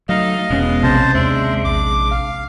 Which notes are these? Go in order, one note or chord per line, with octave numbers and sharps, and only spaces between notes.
F#3 A3 D#4 D#5 F5
E1 B2 G#3 B3 C#4
A#1 C3 C#4 C5 A5
D#2 G#3 D4 C5 E5
A#1 D6
F5